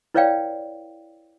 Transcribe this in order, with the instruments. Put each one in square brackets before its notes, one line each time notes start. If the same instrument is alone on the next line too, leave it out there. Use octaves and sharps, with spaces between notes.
[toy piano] E4 B4 C#5 D5 F5 G5